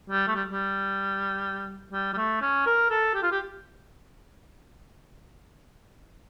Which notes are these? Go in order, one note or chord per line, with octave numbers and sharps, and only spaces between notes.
G3
A3
G3
G3
G3
G3
A3
C#4
A#4
A4
G4
F4
G4